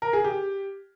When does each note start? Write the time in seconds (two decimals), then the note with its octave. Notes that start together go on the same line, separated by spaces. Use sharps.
0.02 A#4
0.13 G#4
0.24 G4